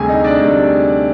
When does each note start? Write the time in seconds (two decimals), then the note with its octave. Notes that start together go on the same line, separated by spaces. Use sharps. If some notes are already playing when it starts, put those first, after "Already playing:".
Already playing: D2 C3 G3 G#4 G#5
0.08 D#4 D#5
0.24 D4 D5
0.40 D2 C3 G3